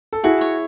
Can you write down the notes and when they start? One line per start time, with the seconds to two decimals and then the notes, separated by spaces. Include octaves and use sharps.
0.13 A4
0.24 E4 F#4 G#4
0.41 C#5